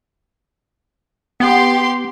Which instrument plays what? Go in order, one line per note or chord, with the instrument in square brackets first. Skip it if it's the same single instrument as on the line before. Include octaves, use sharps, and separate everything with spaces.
[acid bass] B3 [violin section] G4 C6